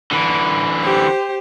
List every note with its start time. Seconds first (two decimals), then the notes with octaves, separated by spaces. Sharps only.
0.11 D3 E3
0.82 G4 C5